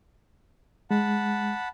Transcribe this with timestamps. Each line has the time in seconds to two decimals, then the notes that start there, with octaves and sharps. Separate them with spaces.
0.91 G#3 F#5 A5 B5